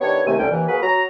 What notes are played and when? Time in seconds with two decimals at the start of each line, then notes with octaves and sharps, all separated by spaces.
0.01 D#3 B3 D4 G4 C#5
0.26 D#2 C3 A3 G#5
0.39 C2 D3 C#4 G5
0.51 D#2 E3
0.68 A#3 F#4 G#4 A#4 B4
0.83 F#3 A#5